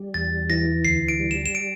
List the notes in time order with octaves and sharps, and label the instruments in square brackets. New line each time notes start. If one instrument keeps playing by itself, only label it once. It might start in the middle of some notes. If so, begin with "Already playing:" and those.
Already playing: [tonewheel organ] G3
[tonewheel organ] E2 [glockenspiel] A6
[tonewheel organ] E3 [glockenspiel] A#6
[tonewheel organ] D2 [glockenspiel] C7
[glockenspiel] D7
[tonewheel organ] G3
[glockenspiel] E7
E7
D7